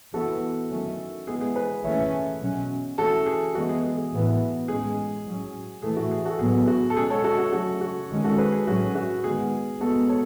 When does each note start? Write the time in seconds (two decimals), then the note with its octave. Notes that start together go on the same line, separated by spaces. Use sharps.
0.13 E3 B3 F#4 A4
0.70 D#3 F#3 A3 C#4
1.27 E3 G#3 B3 G#4
1.41 G#4
1.56 G#4 B4
1.84 E3 A3 C#4 C#5 E5
2.41 B2 F#3 C#4
2.98 E3 A3 C#4 F#4 A4
3.26 G#4
3.55 E3 G#3 B3 F#4
3.69 G#4
3.83 G#4
3.97 G#4
4.12 A2 E3 B3
4.68 A2 G#3 C#4 G#4
5.25 A2 F#3 C#4
5.82 A2 E3 A3 G#4
5.96 F#4
6.11 G#4
6.25 F#4 A4
6.39 A2 F#3 B3 G#4
6.67 F#4
6.90 A4
6.96 B2 G#3 C#4 G#4
7.10 A4 C#5
7.24 F#4 A4
7.38 F#4
7.53 C#3 F#3 A3 C#4 F#4 A4
7.81 F#4
8.10 D#3 G#3 C#4
8.24 F#4 A4
8.38 G#4 B4
8.52 G#4
8.67 A2 F#3 C#4 F#4
8.95 F#4
9.24 D#3 G#3 B3 G#4
9.80 B2 G#3 B3 F#4 A4
10.09 A4 C#5